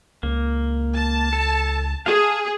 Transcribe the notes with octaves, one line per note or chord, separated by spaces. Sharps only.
C#2 A#3
A5
A4
G#4 F5 G#5 A5